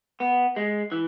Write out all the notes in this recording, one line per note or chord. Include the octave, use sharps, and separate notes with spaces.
B3
G#3
E3